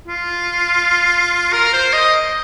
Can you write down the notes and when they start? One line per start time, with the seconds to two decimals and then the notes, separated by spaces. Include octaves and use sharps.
0.08 F4
1.53 A#4
1.73 C5
1.93 D#5